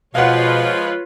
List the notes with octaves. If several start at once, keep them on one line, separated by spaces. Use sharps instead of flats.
B2 F3 G#3 F4 B4 C#5 F5 F#5